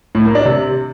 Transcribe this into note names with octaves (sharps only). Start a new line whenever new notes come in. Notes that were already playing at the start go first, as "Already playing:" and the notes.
A2
A#3
D4
C3